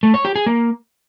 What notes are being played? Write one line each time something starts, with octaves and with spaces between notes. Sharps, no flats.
A3
C#5
G4
G#4
A#3